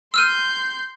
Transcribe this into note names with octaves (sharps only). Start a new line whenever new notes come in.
C6 E6 F6 G6 D#7